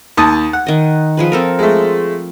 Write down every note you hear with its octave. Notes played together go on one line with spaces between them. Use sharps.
D#2 A5 D#6
F#5
D#3 D#5
F3 G#4 B4
C4 A4 A#4
G#3 A3